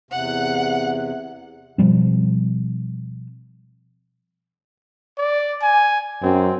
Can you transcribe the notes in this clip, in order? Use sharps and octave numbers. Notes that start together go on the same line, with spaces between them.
E2 C3 F#5 F#6
B2 F3 G3 C4
D5
G#5
F#2 C4